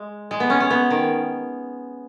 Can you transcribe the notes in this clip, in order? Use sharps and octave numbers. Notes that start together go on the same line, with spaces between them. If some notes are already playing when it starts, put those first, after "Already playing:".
Already playing: G#3
G#3
B3
C#4
C#4
B3
D#3